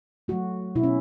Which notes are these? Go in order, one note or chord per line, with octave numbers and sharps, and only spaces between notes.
F#3 A3 F#4
B2 E4
C#4